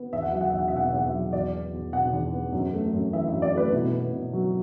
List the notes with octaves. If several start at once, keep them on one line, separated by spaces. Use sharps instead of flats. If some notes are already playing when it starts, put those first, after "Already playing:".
Already playing: B3
E2 E5
F#5
F#3 E5
F#5
E2 E5
F#5
E5
B2 F#5
E5
E2 F#5
E5
F#3
E2 D5
B3
E2
B2 F#5
E2
B3
F#2
A3
F#2
E3 E5
F#2 E5
D5
A3 B4
B2 E4
B3
B2
F#3